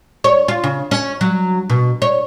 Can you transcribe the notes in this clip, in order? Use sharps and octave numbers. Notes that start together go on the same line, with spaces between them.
C#5
F4
C#3
C#4
F#3
B2
C#5